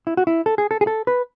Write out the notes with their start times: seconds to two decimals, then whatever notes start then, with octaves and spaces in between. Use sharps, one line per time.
0.07 E4
0.17 F#4
0.27 E4
0.46 A4
0.58 G#4
0.71 A4
0.81 G#4
0.87 A4
1.07 B4